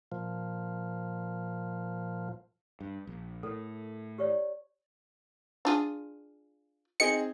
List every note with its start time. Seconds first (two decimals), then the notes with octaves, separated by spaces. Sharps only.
0.12 A#2 F3
2.81 G2
3.07 A#1
3.43 A2 A4 A#4
4.18 G4 C#5 D5
5.65 D4 F4 G#4
7.00 C4 D#4 G#4 C#7